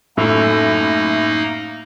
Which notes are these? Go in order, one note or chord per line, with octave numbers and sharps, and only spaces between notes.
F#2 A2 A3 A#3 D#4